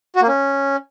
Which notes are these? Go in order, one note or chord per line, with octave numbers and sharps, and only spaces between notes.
F#4
A#3
C#4